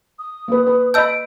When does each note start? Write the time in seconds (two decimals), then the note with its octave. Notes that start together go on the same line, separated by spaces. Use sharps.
0.19 D#6
0.48 A#3 B4
0.67 B4
0.94 D#5 A5 B5 E6 G6 D7